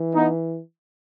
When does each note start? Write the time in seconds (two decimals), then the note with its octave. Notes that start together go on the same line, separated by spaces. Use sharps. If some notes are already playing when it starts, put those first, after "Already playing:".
Already playing: E3
0.15 B3 D#4